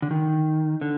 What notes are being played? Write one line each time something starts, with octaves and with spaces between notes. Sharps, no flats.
D3
D#3
D3